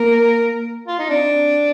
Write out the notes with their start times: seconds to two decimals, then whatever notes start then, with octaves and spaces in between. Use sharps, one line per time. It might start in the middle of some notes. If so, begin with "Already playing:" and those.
Already playing: A#3 A#4
0.88 F4
0.99 D#4
1.09 C4 D4